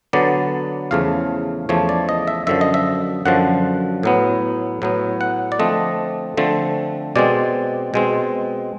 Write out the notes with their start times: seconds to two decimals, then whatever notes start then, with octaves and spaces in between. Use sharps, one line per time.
0.13 D3 F#3 B3 D5
0.91 E2 C#3 F3 A3 F5
1.69 E2 C#3 F3 A3 C#5
1.89 D5
2.09 D#5
2.27 E5
2.47 F#2 D3 F3 E5
2.61 D#5
2.74 E5
3.25 F#2 D3 F3 F#5
4.03 A2 F#3 B3
4.82 A2 F#3 B3
5.21 F#5
5.52 D5
5.60 D3 F3 A3 C4 D#5
6.37 D3 F3 A3 C4
7.16 B2 G#3 C4 D5
7.94 B2 G#3 C4